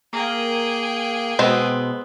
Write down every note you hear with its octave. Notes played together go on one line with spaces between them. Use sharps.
A#3 G#4 G5
B2 G#3 B3 C4